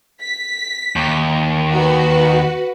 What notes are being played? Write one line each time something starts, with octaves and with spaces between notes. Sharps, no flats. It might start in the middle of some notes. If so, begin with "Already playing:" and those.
B6
D#2
F#4 B4